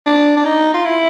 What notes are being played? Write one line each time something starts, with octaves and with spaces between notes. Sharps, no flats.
D4
D4
D#4
F4
E4